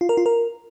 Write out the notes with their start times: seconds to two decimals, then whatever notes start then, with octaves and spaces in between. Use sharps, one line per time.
0.01 F4
0.09 A#4
0.17 F4
0.26 A#4